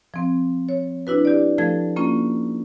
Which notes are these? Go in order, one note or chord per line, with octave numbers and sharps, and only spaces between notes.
F3 C4
C#5
D4 E4 F#4 B4
G4 D5
F3 A3 A4 G#6
A#3 C#4 F4